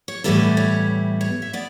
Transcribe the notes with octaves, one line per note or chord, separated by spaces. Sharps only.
C#5
A2 E3 G3 B3 E4 A4
C#5
C#5
E5
B3 D5